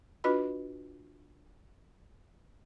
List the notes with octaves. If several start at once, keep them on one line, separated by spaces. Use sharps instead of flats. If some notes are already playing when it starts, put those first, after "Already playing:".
D4 F4 F#4 B4 D#5 B5